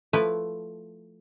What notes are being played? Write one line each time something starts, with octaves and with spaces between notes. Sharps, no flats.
F3 A3 E4 B4